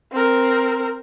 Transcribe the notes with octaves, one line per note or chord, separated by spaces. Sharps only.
C4 A#4